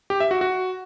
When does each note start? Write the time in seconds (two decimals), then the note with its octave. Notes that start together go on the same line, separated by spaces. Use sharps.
0.10 G4
0.20 E5
0.31 F#4
0.41 F#4